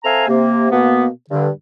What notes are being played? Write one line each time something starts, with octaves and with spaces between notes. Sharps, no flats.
C4 A4 E5 F5 G#5 A#5
C3 A#3
B2 A#3 B3
G2 D3